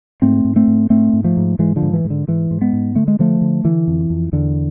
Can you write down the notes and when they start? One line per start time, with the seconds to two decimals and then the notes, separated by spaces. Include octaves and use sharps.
0.22 G#2 A3 C4
0.45 G#2
0.56 A3 C4
0.67 G#2
0.90 G#2 A3 C4
1.13 G#2
1.24 F3 A3
1.37 G#2
1.59 G#2 E3 G#3
1.76 D3 F3
1.82 G#2
1.93 E3
2.05 G#2
2.10 D3
2.28 G#2 E3
2.51 G#2
2.61 G#3 B3
2.73 G#2
2.95 D3 A3
3.08 G#3
3.19 D3 F3 A3
3.41 D3
3.64 D3 E3
3.87 F2
4.10 F2
4.33 E2 D3